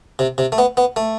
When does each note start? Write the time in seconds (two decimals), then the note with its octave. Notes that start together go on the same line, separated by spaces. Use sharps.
0.19 C3
0.38 C3
0.52 A3
0.58 B3
0.77 B3
0.96 A3